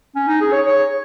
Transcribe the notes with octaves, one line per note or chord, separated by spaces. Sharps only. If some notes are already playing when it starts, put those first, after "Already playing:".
C#4
D#4
G#4
C#5
C#5